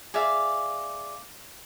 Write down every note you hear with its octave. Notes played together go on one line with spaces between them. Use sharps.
G#4 D5 E5 F5